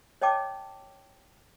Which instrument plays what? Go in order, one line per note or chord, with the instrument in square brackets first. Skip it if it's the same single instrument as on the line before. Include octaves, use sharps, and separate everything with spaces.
[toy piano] C#5 D#5 G5 A5 D6